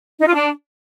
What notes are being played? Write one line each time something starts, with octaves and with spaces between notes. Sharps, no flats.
D#4
F4
D4